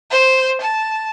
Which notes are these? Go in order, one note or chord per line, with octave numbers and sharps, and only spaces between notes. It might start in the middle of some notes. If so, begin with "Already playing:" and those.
C5
A5